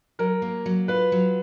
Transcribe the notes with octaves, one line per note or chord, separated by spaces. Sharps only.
F#3 A#4
A#3
F#3
F4 B4
F#3